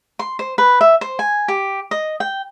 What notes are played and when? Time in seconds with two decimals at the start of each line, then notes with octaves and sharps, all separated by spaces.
0.19 C6
0.39 C5
0.58 B4
0.81 E5
1.01 C5
1.19 G#5
1.48 G4
1.91 D#5
2.20 G5